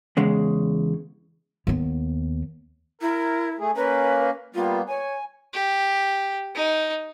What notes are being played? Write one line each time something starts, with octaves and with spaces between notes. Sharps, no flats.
E2 C#3 G#3
D#2 B3
E4 A#4
A3 G#4
A#3 C#4 A#4 B4
G3 A#3 B3 F4
C#5 G#5
G4
D#4